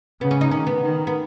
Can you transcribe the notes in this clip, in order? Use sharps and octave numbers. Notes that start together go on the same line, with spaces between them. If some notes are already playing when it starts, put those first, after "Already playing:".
C#3 B3
C#4
D#4
D#3 C#4
B3
D#3
B3